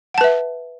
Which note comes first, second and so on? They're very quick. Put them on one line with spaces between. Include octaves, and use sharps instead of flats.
F#5 A5 B4 E5